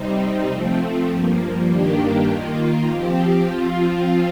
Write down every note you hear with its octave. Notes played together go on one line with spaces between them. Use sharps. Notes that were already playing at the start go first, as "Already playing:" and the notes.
Already playing: C3 G3 C4 D#4
F3 A3 C4
G2 F3 A#3
G2 D#3 A#3 D4 G4
D#3 A#3 F4
F3 C4 G4
F3 C4 F4